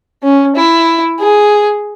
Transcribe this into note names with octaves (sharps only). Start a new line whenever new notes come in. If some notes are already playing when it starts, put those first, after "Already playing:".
C#4
E4
G#4